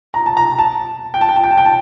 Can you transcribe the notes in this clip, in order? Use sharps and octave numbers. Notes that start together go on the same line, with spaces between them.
A#5
A5
A#5
A5
G5
A5
G5
A5
G5
A5
G5
A5